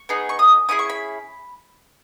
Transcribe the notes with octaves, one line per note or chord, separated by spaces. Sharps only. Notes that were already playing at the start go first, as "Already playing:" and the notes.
Already playing: C#6
B3 D#4 G#4
C#6
D#6
C#4 E4 G#4 D#6
C#6
B5